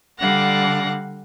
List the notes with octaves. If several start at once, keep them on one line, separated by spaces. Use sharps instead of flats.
D3 G3 F5 F#5 F#6 A#6